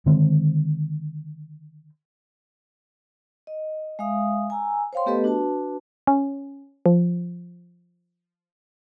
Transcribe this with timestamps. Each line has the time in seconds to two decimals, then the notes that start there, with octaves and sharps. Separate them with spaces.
0.06 D3 D#3 G#3 C4
3.47 D#5
3.99 G#3 E5 F5 D#6
4.50 G#5 A#5 E6
4.93 C5 C#5 F5 G5 C6
5.06 A3 B3 G4 A4 B4 D#5
5.24 D4 F#4 B4 A5
6.07 C#4
6.86 F3